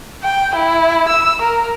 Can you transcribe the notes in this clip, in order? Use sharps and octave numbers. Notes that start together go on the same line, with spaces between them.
G5
E4
E6
A#4